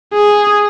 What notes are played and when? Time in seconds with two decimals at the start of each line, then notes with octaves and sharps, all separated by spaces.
0.14 G#4